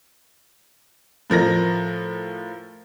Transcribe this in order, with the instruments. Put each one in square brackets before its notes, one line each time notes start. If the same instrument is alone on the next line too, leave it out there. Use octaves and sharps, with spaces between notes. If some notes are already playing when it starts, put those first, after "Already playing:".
[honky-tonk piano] A2 F3 A#4 A#6